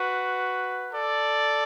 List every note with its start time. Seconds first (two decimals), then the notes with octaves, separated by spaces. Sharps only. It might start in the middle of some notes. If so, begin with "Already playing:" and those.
Already playing: F#4 B4
0.93 A4 D5